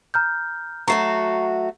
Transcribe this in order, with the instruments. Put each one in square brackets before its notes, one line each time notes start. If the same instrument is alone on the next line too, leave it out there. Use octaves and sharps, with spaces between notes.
[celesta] A#5 F6 G6
[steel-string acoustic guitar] F#3 A3 F#4 [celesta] A#5 C#6 C7